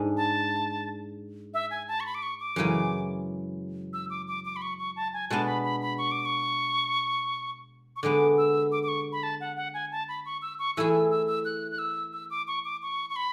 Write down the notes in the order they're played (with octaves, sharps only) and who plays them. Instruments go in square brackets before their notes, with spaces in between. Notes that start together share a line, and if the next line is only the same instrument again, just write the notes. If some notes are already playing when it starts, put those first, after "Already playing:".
Already playing: [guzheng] G#2 G#3 D4
[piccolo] A5
E5
G#5
A5
C#6
B5
D6
C#6
D6
[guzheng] F#2 C#3 E3 G#3
[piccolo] E6
D6
D6
D6
B5
C#6
C#6
A5
G#5
[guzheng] B2 G#3 B3 D4 [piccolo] A5
[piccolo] B5
B5
B5
C#6
D6
C#6
C#6
[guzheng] D3 G#3 B3 [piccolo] D6
[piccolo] E6
D6
D6
C#6
B5
A5
F#5
F#5
G#5
A5
B5
C#6
E6
C#6
[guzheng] E3 A3 E4 G#4 [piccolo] E6
[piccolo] E6
E6
E6
F#6
F#6
E6
E6
D6
C#6
D6
C#6
C#6
B5